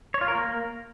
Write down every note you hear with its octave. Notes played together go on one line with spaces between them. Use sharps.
C#5
F4
A#4
A#3